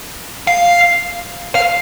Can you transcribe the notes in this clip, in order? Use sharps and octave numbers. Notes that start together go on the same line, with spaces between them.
F5
F5